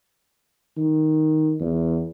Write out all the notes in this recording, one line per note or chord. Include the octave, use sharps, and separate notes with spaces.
D#3
E2